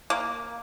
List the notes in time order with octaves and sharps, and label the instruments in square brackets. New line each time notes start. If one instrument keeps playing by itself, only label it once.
[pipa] A#3